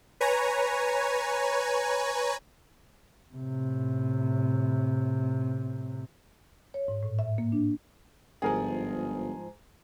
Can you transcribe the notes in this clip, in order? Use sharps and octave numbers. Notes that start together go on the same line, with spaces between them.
B4 C#5 G#5 A#5
A2 C3
C#5
G#2
A2
E5
A#3
D4
G1 G#2 F3 G#4 A#4 G#5